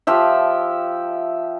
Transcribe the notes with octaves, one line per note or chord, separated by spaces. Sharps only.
F3 G4 E5